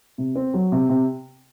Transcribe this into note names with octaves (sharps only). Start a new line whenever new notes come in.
C3
C4
F#3
C3
C3